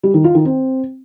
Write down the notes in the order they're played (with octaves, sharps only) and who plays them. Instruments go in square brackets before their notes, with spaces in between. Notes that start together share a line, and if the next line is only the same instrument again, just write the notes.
[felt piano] G3
D#3
F4
D#3
C4